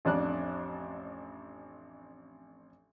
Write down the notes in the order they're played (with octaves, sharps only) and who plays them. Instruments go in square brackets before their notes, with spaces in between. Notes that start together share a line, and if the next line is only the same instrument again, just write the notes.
[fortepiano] A1 F2 D4 F#6